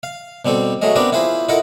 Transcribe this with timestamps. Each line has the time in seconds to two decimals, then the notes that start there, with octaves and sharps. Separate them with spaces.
0.03 F5
0.45 B2 G3 C4 A4
0.82 F#3 G#3 A3 G#4 D#5
0.96 B3 C4 D4 G4 A#4 B4
1.12 E4 F4 G#4 B4 C5
1.49 E4 F4 A4 A#4 D#5 F#5